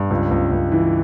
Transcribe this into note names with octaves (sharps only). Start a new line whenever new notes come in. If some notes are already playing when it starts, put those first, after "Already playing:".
Already playing: G2
C#2
C#2
C#2
E3